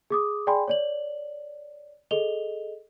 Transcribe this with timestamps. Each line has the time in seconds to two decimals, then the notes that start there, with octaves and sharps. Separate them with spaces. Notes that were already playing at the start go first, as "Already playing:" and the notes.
0.10 G#4 D6 D#6
0.47 G#4 D5 G5 G#5 B5 C6
0.68 C#5 D5 F#7
2.11 G#4 A4 D#5 F7 G7